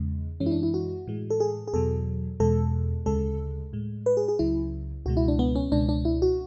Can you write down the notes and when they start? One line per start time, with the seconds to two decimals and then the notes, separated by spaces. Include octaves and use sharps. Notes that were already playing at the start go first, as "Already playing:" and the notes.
Already playing: E2 C#3 G#3
0.40 F#2 E3 G#3 C#4
0.46 E4
0.51 D4
0.63 E4
0.74 F#4
1.07 A2 E3 G#3
1.30 A4
1.40 G#4
1.67 G#4
1.73 E2 B2 F#3 A4
2.40 E2 B2 G#3 A4
3.06 D2 C#3 G#3 A4
3.73 A2 G#3
4.06 B4
4.17 G#4
4.28 G#4
4.39 C#2 C#3 F#3 E4
5.06 C#2 B2 G#3 F#4
5.17 E4
5.28 D4
5.39 B3
5.56 C#4
5.72 C#2 B2 G#3 D4
5.89 D4
6.05 E4
6.22 F#4